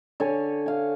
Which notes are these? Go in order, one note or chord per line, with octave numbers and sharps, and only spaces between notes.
D3 C#5 G#5
F5 G#5